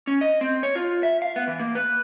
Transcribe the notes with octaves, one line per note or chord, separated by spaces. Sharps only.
C#4
D#5
C4
C#5
F4
E5
F5
B3
E3
A#3
B4